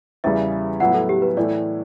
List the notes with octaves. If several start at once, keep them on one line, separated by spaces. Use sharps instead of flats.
E2 C#3 E3 G3 E5
E5
A2 F#3 B3 E4 F#5
A4
G4
B4
A2 E3 A3 D5